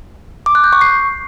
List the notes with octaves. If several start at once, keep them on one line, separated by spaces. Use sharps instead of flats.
D6
F#6
G6
C#6
C7